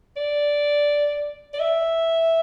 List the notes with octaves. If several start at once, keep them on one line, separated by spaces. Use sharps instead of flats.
D5
D5
E5